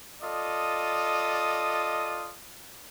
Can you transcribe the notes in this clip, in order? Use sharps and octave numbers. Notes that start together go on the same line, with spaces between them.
F4 A4 D5 D#5 D#6